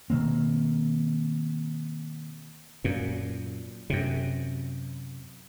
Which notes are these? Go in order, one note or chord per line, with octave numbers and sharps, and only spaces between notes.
B2 D#3 A#3 C4
F#2 A#2
F#2 C3